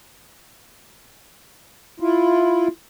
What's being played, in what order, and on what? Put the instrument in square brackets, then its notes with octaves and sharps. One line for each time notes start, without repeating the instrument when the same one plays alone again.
[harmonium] E4 F4